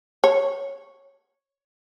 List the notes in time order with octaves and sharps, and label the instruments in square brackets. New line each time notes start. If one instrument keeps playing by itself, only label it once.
[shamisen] C#5